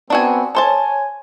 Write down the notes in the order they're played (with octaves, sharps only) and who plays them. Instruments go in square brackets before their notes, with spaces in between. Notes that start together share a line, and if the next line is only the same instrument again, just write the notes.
[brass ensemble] B3 C4 [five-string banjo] D4 F#4 G#5
[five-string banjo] A4 C5 A5 [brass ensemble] C#5 G#5